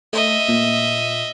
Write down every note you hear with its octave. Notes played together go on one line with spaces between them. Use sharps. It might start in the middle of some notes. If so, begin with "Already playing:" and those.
A3 D#5 E5
A#2